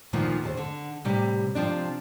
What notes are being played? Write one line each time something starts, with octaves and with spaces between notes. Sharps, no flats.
D2 A#2 D#3 F3 A#3 B3
D#2 A4 C5
D3
A2 C3 G3
C3 F3 C4 D4